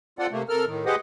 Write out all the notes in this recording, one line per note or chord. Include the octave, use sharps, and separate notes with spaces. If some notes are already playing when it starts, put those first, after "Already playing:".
C4 F4 A4 D5 F#5
C3 A3 A#3
C3 A4 A#4 F6
A2 D#3
G4 G#4 B4 C5 D#5 F#5